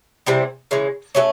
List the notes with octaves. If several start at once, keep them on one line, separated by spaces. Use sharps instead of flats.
C3 E3 G3 C4
C#3 E3 G#3
F#3 A3 C#4